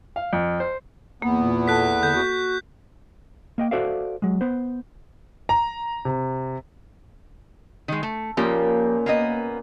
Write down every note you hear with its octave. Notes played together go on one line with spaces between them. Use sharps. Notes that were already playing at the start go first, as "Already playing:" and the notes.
F5
F2
C5
E2 A#3 B3
A#2
A4 A5 F#6 B6
D3 G6
F#4
A#3 D#5 G5
F#4 A4 C5 D5 E5 F5
F#3 G#3
B3 C5
A#5
C3
D#3 G#3
A3
A#2 C#3 F3 A#3 G4
A#3 B3 D#5